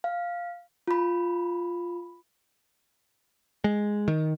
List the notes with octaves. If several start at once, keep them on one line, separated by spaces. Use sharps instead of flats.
F5
F4 B5
G#3
D#3